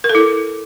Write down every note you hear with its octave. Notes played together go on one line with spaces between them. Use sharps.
A#4
A4
E4